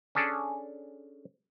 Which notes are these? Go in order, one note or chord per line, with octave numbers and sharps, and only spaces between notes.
C#4 D4 G#4 A4 D5